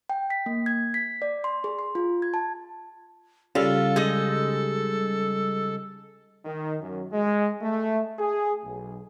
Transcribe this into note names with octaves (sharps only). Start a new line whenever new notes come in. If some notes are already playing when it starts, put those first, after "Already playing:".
G5
B6
A#3
G#6
B6
D5
C6
G#4
C6
F4
G#6
A5
C#3 G3 F4 A4
G#3 D#4 D#5
D#3
F#2
G#3
A3
G#4
B1